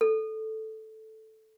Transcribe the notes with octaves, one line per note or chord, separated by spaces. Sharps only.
A4